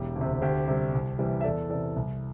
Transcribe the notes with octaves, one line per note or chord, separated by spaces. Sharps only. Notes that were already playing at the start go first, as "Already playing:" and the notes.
Already playing: E1 G4
D2
C3
D2 G4 C5
C3 G3
C2
C3 E3 G3
E5
E2 A4 D5
C3 E3 A4 D5
C2